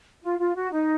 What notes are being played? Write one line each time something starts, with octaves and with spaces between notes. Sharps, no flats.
F4
F4
F#4
D#4